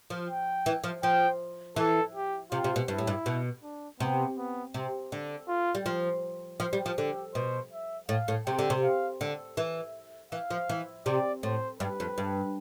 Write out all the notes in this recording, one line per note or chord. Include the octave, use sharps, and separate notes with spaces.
F3
G5
E3
F3
F3 G5
E3 A4
G4
C3 F4
C3
B2
G2 E4
A2
G2
B2
D4
C3 B3
B3
C3
D3
F4
G3
F3
F3
G3
F3
D3 G4
B2 C5
E5
A2 F5
A2
C3 G5
D3
C3
F5
D3
E3
E3 F5
F3
E3
C3 D5
A2 C5
G2 B4
F2
G2